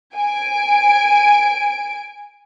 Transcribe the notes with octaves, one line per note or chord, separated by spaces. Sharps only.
G#5 D7